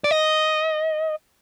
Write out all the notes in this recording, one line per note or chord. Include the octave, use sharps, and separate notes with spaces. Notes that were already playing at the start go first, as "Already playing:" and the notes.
D5
D#5